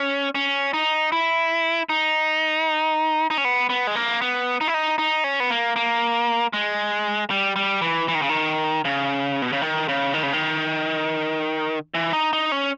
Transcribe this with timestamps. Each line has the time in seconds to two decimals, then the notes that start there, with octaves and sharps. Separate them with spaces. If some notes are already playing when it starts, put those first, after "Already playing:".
Already playing: C#4
0.35 C#4
0.74 D#4
1.12 E4
1.89 D#4
3.30 D#4
3.38 C#4
3.45 B3
3.70 B3
3.87 G#3
3.96 A#3
4.22 B3
4.61 D#4
4.68 E4
4.74 D#4
4.98 D#4
5.24 C#4
5.40 B3
5.50 A#3
5.76 A#3
6.53 G#3
7.30 G3
7.56 G3
7.81 E3
8.08 E3
8.15 D#3
8.22 C#3
8.29 D#3
8.85 C#3
9.42 B2
9.53 C#3
9.62 D#3
9.88 C#3
10.14 D#3
10.23 C#3
10.33 D#3
11.94 E3
12.13 D#4
12.33 D#4
12.52 C#4